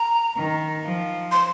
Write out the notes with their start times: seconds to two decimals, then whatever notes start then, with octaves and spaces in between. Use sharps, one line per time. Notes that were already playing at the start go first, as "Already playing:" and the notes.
Already playing: A#5
0.37 D#3
0.84 F3
1.32 C6